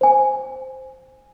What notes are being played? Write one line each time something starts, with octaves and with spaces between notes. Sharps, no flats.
C5 G#5